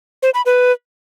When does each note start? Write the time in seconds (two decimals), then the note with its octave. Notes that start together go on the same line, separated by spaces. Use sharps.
0.23 C5
0.34 B5
0.46 B4